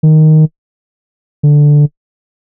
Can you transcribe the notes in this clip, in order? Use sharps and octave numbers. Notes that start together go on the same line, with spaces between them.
D#3
D3